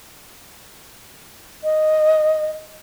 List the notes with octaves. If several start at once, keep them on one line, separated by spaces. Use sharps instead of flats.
D#5